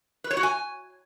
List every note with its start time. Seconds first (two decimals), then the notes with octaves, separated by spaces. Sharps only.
0.24 B4
0.31 C#5
0.37 F#4
0.43 G#5